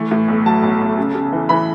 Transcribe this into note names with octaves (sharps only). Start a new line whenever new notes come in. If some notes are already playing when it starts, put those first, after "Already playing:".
Already playing: E3 A3
A2
B1
F#3 A5
B1
B1
C#3
C#3
E3
E3 B5